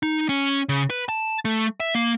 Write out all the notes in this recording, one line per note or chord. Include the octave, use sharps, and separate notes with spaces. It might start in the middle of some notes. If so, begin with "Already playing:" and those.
D#4
C#4
C#3
B4
A5
A3
E5
A#3